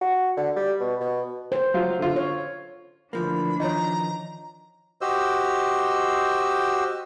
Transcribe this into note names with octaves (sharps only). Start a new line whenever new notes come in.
F#4
D3
G3
B2
B2
C5
F#3 F4
D3 F4
C#5
D2 E3 F3 A#3 D4 B5
D#3 F3 D#4 C#5 D#5 A#5
F#4 G4 C5 D#5 E6